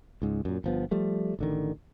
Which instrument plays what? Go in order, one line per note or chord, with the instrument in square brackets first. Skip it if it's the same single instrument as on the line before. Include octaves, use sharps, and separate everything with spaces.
[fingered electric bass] C#2 G#2
F#2 A#2
G1 F3 B3
F3 G3 A3
A1 D3 D#3